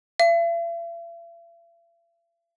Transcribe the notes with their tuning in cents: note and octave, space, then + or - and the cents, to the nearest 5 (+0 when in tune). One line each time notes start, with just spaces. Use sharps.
E5 +45